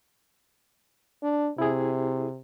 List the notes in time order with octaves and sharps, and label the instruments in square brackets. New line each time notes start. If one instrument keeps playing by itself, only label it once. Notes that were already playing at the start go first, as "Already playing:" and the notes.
[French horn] D4
[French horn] C3 [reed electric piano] E4 G#4